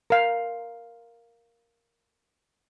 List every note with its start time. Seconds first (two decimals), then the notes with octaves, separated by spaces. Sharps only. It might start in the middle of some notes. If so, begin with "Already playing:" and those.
0.10 A#4 F5